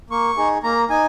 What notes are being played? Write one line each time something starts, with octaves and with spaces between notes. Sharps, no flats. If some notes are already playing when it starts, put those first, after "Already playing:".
A#3 C#6
D#4 G#4
A#3 A#5
D#4 G#5